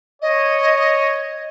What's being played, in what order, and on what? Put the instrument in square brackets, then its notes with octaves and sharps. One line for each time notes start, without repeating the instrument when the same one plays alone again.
[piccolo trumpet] C#5 [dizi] D#5